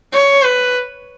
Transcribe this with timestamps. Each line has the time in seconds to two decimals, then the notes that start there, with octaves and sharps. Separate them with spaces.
0.13 C#5
0.43 B4